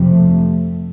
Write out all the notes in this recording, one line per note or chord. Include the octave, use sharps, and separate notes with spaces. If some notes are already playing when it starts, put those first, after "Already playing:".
Already playing: F2 C3
A3